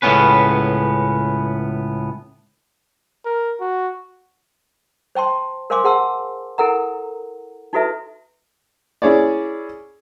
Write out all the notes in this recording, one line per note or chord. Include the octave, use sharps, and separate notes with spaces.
C#2 A2 B3 C#4 B4
A#4
F#4
C5 G5 A5 C6
A#4 C5 F5 G#5 C6 D6
G#4 C5 F#5 A5 C6 E6
E4 A4 A#4 F#5 A#5
D#4 E4 F#4 A4 B4 E5
C#4 E4 G#4 C#5 D5